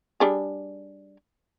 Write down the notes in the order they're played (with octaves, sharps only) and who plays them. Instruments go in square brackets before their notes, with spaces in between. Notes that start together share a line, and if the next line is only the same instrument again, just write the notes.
[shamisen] G3 D4 G#4